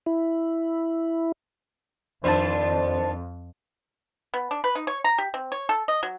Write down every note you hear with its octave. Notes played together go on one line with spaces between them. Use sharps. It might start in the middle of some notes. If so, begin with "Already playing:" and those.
E4
F2 D#3 D4 F4 C5 A5
B3
D4
B4
D#4
C#5
A#5
G4
C4
C#5
A4
D#5
F#3